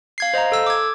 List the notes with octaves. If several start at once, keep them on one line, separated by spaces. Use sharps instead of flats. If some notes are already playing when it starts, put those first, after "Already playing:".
F5 G#6 C7
C5 D#5 F5 A#5
A4 E6
D6 G#6